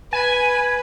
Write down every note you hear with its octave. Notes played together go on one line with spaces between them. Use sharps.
B4 G#5